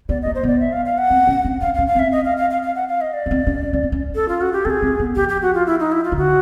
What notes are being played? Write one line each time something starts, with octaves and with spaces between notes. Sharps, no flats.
B3 D5
A#3 D#5
C5
B3 D5
E5
F5
F5
F#5
C4
C#4
C4
C4 F5
F5
C#4
F5
C4 E5
D#5
F5
F5
F5
F5
F#5
F5
D#5
D5
C#4
C4
C#4
C#4
C4
C#4
A4
F4
F#4
G4
C4 G#4 A4
C4
B3
F3 G4
G4
F#4
F4
E4
D#4
E4
F4
D#3
D3 F#4